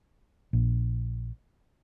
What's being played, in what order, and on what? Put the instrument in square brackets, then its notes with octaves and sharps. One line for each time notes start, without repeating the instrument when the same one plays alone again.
[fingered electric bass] A#1